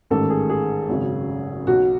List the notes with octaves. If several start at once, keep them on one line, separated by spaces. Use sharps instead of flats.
A1 G#2 D#3 A4
G#4
G#4
G#1 F#2 C#3
B1 B2 F#4